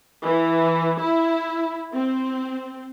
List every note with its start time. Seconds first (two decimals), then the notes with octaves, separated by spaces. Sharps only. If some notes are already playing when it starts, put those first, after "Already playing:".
0.24 E3
1.00 E4
1.93 C4